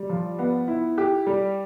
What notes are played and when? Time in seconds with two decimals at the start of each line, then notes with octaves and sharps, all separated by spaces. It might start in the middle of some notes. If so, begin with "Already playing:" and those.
Already playing: G3
0.10 F3
0.39 B3
0.68 E4
0.98 G4
1.27 G3